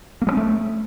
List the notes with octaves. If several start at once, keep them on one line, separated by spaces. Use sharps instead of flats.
A#3
G#3
C#4
A3